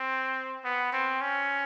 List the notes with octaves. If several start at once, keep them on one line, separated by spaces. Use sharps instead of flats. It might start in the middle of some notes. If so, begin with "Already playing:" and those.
Already playing: C4
B3
C4
C#4